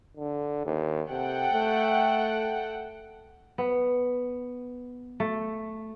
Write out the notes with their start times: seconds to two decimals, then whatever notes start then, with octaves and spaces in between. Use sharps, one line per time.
0.17 D3
0.66 D#2
1.10 C3 A4 F#5 G5
1.53 A3
3.58 B3
5.20 A3